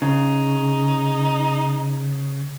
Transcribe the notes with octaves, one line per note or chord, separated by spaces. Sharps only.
C#3 D#4